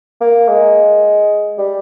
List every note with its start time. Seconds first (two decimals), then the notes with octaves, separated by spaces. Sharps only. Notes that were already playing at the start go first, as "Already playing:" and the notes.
0.21 A#3
0.48 G#3
1.58 G3